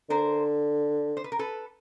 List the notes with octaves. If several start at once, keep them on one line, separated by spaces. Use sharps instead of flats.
D3 A#4 C5
C5
B4
A#4
A4 B4